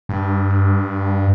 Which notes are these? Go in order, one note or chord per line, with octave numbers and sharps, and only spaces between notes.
G2